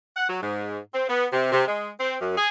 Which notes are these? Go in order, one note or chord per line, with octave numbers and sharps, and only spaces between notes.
F#5
F#3
G#2
C4
B3
C3
C3
G#3
C4
F#2
G#4